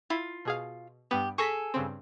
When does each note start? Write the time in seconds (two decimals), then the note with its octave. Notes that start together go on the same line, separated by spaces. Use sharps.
0.10 E4 F4
0.45 B2 G#4 F5
1.11 G2 B3 G4
1.38 G#4 A4 C#6 A#6 B6
1.74 G2 C#3 C4